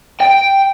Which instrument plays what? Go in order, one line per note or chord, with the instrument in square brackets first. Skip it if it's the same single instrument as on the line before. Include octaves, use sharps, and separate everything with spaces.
[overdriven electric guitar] G5